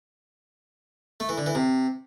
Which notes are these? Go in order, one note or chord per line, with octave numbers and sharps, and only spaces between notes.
A3
E3
D3
E3
C3